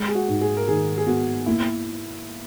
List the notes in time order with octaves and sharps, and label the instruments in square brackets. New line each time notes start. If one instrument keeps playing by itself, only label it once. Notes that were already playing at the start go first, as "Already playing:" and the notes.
Already playing: [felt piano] G#3
[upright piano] G#4
F#4
[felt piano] G#2
[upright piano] G#4
A#4
[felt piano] D#3 [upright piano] G#4
[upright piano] G#4
[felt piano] B3 [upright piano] F#4
[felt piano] A#3 [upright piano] E4